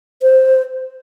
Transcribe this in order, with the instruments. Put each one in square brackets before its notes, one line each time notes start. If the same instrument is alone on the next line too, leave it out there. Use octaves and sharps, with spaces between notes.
[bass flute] C5